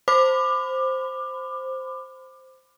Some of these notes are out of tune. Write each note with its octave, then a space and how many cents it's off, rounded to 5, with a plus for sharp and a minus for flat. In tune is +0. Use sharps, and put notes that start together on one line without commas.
C5 +0 B5 +30 D6 +20